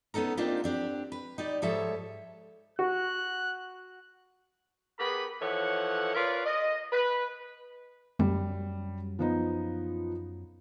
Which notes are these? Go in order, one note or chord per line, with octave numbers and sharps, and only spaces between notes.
B3 C#4 D#4 A4 A#4
A#3 C4 D4 D#4 F4 G4
C4 D4 G4
B4
D#4 G4 D5
G#2 F3 G3 A4 C#5 E5
F#4 F#6
B3 G4 G#4 A#4 B5
E3 F3 A4 C#5 F#5
F4 A#4 B4 C#5 D5
D#5
B4
F#2 G3
F3 B3 D#4